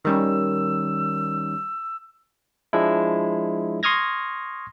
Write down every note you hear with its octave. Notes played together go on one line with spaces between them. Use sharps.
D#3 G3 C#4 E6
F3 G#3 D4 E4
C6 C#6 D#6 F6 G#6 A#6